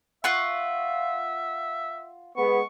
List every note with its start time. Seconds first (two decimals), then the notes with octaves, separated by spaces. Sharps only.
0.24 F4 E5 F#5 C#6
2.36 G#3 B3 C#6